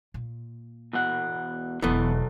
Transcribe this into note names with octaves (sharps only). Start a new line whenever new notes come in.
A#2
E2 B2 F#5
E1 E3 F#3 B3 A4